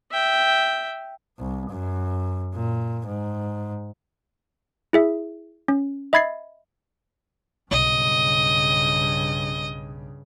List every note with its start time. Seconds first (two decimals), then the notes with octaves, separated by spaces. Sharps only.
0.11 E5 G5
1.39 C2
1.70 F#2
2.54 A#2
3.07 G#2
4.93 E4 G#4 E5
5.68 C#4
6.13 D#5 E5 B5 G#6 A6 C7
7.71 B1 G2 C#3 D#5